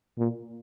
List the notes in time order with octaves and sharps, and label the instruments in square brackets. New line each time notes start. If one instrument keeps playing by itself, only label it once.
[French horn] A#2